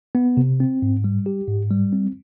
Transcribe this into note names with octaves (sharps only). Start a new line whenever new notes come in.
B3
C3
C4
G#2
G3
G4
G#2
G3
C4